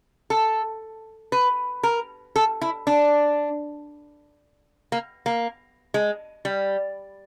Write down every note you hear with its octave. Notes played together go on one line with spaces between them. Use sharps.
A4
B4
A#4
A4
E4
D4
A#3
A#3
G#3
G3